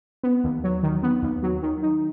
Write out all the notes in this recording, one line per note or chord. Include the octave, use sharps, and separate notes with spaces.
B3
D#2
F#3
D#3
B3
D#2
F#3
D#3
D#4